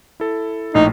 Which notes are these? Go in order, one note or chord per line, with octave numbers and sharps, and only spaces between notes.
E4 A4
A#1 A2 D#4 C7